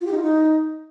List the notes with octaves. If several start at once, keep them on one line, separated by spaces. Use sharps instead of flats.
F4
G4
D#4
F4
D#4